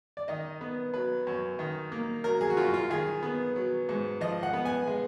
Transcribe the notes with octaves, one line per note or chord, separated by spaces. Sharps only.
D5
D#3 D#5
B3
F#3 B4
F#2
D#3
A#3
F#3 A#4
G#4
F#4
F#2 F4
F4
D#3 G#4
B3
F#3
G#2
F3 D#5
F#5
B3
G#5
G#3